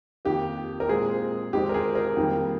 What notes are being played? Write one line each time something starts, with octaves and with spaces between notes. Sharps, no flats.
F2 D#3 A#3 G4
A#4
A#2 G#3 C4 G#4
F2 D#3 G#3 C4 G4
A#4
G#4
A#4
F2 D#3 G3 A#3